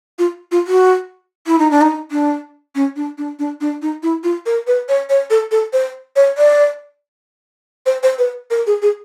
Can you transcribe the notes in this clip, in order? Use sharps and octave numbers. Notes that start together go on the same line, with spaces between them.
F4
F4
F#4
E4
D#4
D4
D#4
D4
C#4
D4
D4
D4
D4
D#4
E4
F4
A#4
B4
C#5
C#5
A4
A4
C5
C#5
D5
C5
C5
B4
A#4
G#4
G#4